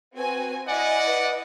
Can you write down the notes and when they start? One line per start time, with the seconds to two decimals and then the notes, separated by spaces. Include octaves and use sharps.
0.17 C4 F#4 B4 G#5
0.67 E4 D5 D#5 F#5 G#5
1.07 B4